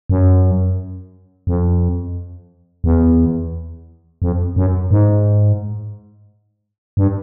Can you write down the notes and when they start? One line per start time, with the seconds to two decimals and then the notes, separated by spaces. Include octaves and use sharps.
0.10 F#2
1.47 F2
2.84 E2
4.22 F2
4.56 F#2
4.91 G#2
6.97 G2